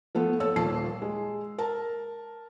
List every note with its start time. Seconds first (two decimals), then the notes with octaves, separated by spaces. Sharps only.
0.15 F3 A3 B3
0.40 A4 C#5 E6
0.56 D#1 A#2 A5 C7
1.02 G#3
1.58 A#4 A5